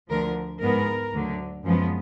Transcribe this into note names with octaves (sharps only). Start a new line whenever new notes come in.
D2 D3 F3 A#4
G#2 F3 G#3 B3 A#4
D2 D3 F#3
F#2 F3 G#3 B3